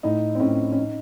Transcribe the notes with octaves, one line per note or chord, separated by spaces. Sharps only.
A2 D#4
C4
A2 C#4
C#4
D#4